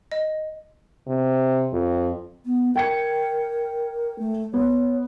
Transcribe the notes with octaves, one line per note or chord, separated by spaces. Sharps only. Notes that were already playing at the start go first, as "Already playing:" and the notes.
D#5
C3
F2
B3
A#4 G5 G#6 C#7
A3
B3 C#5